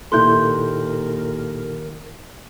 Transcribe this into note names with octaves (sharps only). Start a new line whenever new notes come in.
D#2 A#2 E4 A4 A#4 C6 F#6 G6